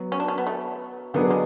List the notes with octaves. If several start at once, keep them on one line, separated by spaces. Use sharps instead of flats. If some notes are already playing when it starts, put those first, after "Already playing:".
Already playing: F#3 B3 F#4
C#4
D4
C#4
B3
A3
D3 F#3 G#3 B3 D4 G#4
G#3